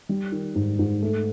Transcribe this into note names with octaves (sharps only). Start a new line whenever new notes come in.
G3
D#3
G#2
G#2
A3